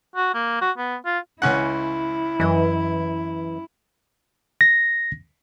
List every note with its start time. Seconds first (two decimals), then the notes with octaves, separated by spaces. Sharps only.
0.16 F#4
0.34 A#3
0.61 F#4
0.78 B3
1.06 F4
1.42 C#2 C#4 E4 F#5
2.40 F#2 E3 D#5
4.61 A#6